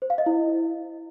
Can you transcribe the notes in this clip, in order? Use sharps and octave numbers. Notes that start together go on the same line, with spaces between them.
C5
F5
D#5
E4